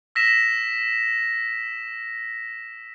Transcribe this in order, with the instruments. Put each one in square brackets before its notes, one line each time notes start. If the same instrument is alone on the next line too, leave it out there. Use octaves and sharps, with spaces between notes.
[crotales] E6 A#6 B6 E7